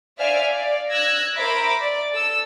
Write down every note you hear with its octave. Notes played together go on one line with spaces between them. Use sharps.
C5 D5 E5 F5 G#5 F6
D5 F5
E6 F#6 G#6 A#6
A#4 C5 E5 B5 D6
D5
A4 E6